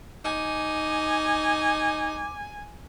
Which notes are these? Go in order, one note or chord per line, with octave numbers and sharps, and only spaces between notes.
D#4 G#5 D6